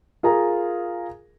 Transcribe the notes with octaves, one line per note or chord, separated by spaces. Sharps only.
F4 G#4 A#4 A#5